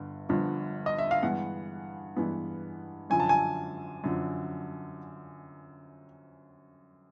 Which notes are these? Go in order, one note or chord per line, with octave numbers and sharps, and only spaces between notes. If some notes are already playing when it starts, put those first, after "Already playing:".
Already playing: G1 G2 D3
G1 G2 D3 F3
D#5
E5
F5
G2 E3 G#3 B3 F#5
G2 E3 G#3 B3
F#2 D3 F3 G#5
A5
G#5
F#2 D3 F3